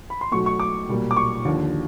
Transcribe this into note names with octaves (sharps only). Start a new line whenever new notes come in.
B5
C6
B1 B2 F#3 A3 C#6
C#6
D6
B1 A#2 G3 A#3
D6
C#6
D#2 D3 F3